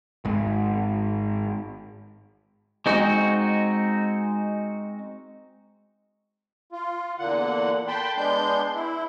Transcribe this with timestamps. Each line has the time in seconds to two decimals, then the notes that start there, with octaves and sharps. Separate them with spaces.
0.25 G#1 G#2
2.86 G#3 C4 D#4 F#4
6.72 F4
7.18 E2 A#2 D3 A#3 F#5
7.87 G5 A5 B5 C6
8.17 G#3 B3 D4 C6 G6
8.74 E4